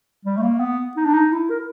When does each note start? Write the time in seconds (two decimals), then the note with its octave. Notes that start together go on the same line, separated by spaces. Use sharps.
0.25 G3
0.37 A3
0.42 A#3
0.60 B3
0.96 D#4
1.05 D4
1.14 D#4
1.33 E4
1.50 A#4